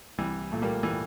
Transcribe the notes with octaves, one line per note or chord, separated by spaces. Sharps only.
C2 E3 G3
A#2 A3
G3 A#3
E3 G3